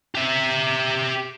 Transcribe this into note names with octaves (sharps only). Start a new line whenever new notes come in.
G4 E5